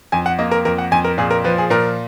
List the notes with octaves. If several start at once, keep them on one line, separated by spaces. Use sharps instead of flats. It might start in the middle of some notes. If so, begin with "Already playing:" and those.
F2 G#5
F#5
A#3 D#5
A#4
F2 A#4
F#5
F2 G#5
A#4
A#2 G#4
A#4
F3 B4
G#4
A#2 A#4